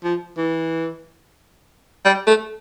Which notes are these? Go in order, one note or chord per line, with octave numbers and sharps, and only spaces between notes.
F3
E3
G3
A3